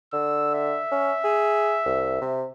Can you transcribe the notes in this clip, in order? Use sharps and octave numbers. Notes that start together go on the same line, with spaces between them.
D3 E6
E5
C#4
G#4
C2
C3